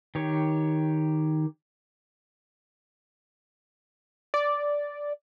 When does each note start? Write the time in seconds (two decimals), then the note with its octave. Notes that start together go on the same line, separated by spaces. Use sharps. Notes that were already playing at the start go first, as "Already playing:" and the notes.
0.15 D#3 G4 C#5
4.34 D5